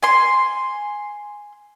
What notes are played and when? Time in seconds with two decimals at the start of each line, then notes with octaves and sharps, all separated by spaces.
0.03 G#5 C6